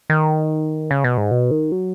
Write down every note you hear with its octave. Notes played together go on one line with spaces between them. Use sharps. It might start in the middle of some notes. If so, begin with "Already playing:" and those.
D#3
C#3
B2
G#2
B2
D#3
F#3